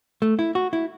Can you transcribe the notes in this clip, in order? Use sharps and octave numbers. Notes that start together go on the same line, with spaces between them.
A3
E4
F#4
E4